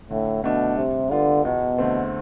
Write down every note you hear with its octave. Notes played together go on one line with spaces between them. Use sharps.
A2 D3
B2 A3 D4
C3 G3
D3 B3 F4
E2 B2
D3 A3 C4